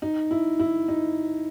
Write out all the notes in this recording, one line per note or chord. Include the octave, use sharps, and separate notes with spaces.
D#4
E4
E4
D#4